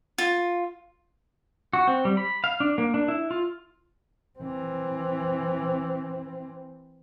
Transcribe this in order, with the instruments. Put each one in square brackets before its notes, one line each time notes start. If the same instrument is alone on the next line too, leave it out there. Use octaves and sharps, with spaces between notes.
[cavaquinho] F4
[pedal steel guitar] F#4
C4
G3
B5
F5
D4
A#3
D4
E4
F4
[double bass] E3 C4